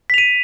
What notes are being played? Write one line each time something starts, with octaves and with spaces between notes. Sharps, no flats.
B6 D#7 F7